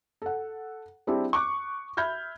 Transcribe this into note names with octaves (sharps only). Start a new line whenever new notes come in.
A4 F#5
G3 C4 D4 E4 G4 G#4
C#6 D6 F#6
E5 B5 F6 G6 G#6